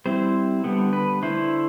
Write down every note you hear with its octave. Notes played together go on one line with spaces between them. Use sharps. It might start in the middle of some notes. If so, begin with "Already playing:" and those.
G3 C4 E4 C5
D3 G3 B3
B4
D3 A3 E4 C5